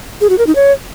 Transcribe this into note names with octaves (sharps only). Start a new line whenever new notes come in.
G#4
F#4
A#4
D#4
C#5